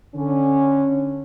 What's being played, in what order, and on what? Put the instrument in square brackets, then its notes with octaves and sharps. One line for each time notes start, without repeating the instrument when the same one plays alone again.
[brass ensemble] D3 C#4